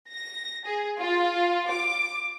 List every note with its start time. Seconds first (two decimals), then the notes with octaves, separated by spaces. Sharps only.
0.13 A#6
0.67 G#4
1.00 F4
1.71 D6